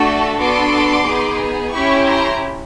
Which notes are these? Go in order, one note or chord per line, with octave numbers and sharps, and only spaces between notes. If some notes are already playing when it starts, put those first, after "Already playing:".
Already playing: A3 D4 F#4 A4
B3 D4 F#4 A4 C6 D6
B3 D#4 G#4
C#4 E4 G4 B5 C#6
A#5 C6